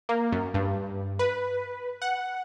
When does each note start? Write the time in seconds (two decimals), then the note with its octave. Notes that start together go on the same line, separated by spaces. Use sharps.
0.09 A#3
0.32 F#2
0.54 G2
1.19 B4
2.02 F#5